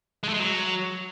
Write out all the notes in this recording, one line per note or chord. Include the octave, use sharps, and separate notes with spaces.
G#3
A3
G#3
F#3